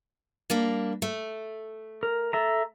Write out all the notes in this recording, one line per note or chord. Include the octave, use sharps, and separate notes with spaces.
G3 A#3 D4
A3
A#4
A4 E5 A#5